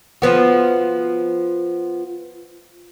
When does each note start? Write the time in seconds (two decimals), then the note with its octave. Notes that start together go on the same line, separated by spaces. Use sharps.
0.22 F3 B3 F#4